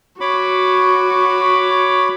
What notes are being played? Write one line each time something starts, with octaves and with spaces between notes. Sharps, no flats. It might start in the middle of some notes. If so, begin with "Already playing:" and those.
F#4 C#5 B5 D6